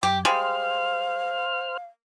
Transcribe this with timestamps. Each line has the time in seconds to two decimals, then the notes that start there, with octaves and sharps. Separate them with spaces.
0.03 F#2 G4 G5
0.25 G3 G#3 C5 F5 F6